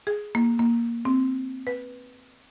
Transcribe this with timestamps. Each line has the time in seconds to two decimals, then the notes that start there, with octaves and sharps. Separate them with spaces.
0.07 G#4
0.35 A#3
0.59 A#3
1.05 C4
1.67 B4